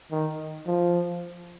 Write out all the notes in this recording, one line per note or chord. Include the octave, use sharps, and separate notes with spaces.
D#3
F3